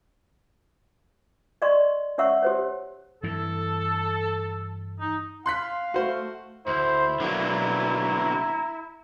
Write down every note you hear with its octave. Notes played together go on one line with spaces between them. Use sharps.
D5 D#5 C6 C#6
C#4 C#5 E5 F#5 C#6 E6
G4 C5 C#5
G2 E3 A4
D#4
F5 C6 F#6 B6
A3 F#4 C5
D2 E4 C5
B1 D3 F#3 A#3 A#5